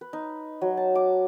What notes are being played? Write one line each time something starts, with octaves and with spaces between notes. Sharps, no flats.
B4
D#4
F#3
A5
D6